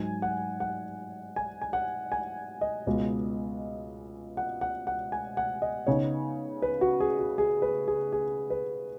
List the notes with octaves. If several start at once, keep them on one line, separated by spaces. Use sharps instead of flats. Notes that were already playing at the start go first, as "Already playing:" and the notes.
Already playing: G#2 F#3 D#4 G#5
F#5
F#5
G#5
G#5
F#5
G#5
D#5
C#2 B2 G#3
F#5
F#5
F#5
G#5
F#5
D#5
C#3 B3 D#4 C#5
B4
F#4
G#4
F#4
G#4
B4
G#4
G#4
B4